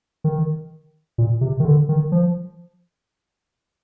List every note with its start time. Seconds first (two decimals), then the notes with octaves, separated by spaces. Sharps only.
0.24 D#3
1.18 A#2
1.41 C3
1.60 D#3
1.65 D3
1.89 D#3
2.12 F3